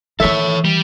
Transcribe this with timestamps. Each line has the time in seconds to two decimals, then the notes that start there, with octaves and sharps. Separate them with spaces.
0.20 D#3 E3 A4 C#5 E5
0.65 G3